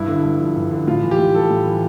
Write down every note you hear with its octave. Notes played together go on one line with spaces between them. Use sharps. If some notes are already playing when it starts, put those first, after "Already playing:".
Already playing: G2 E4
D3
G2
F3
G2
D3
A2 F4
E3
G4
A2
G3 A4
A2
E3